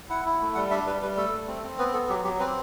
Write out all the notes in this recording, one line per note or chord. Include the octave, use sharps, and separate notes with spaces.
E4 F#5
E4
A3
G3 F#5
D4 E5
G3 B4
G3 B4
A3 A4
A3
C4
C4
B3 B4
B3 A4
F#3 G4
F#3 G4
C4 B4